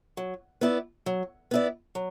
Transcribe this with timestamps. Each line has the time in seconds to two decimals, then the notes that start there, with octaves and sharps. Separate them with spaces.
0.17 F#3
0.61 B3 E4 D5
1.06 F#3
1.51 B3 E4 D5
1.95 F#3